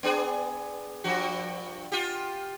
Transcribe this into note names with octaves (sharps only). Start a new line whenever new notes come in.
B3 D4 G#4
G2 F3 F#4
F4 G4